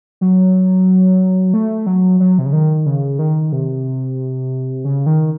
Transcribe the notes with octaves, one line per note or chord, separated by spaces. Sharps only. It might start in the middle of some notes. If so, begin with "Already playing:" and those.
F#3
A3
F#3
F#3
C3
C#3
D#3
C#3
D#3
C3
C#3
D#3